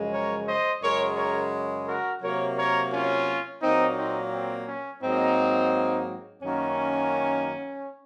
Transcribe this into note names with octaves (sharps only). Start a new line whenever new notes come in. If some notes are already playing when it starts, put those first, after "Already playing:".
Already playing: F#2 C#3 F3 G#3
A#4 C#5
C5 D#5
F#2 C#3 G#3 A#4 C#5
A#4 C#5
F#4 A#4
C3 F#3 A#3 A#4 C#5
A#4 C#5
C#4 F4
A#2 F#3 A#3 C4 D#4
C4 D#4
C4
C#4
G#2 F#3 A#3 C4 D#4
F#2 D#3 F#3 A#3 C#4